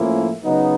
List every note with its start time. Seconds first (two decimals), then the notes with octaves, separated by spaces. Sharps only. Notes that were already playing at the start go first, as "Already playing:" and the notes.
Already playing: A2 F3 A#3 C#4 E4
0.44 C#3 F#3 B3 D#4